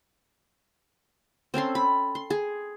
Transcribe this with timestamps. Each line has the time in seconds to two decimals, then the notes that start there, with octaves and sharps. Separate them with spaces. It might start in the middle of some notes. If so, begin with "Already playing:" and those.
1.54 C4 C#4 A4 C6
1.75 B5
2.15 C6
2.30 G#4